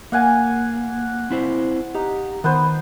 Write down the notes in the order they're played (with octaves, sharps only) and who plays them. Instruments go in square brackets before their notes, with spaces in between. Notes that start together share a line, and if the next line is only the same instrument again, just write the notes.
[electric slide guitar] A#3 [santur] F5 F#5 G#5
[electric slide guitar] C4 E4 C5
[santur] D#4 [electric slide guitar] G4
[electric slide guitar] D#3 [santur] B3 B4 C5